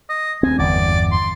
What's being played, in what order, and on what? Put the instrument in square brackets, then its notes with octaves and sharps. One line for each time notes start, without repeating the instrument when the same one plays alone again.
[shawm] D#5
[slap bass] D2 C4 [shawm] G#5
[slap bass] G1 E2 [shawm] D5
[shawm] C6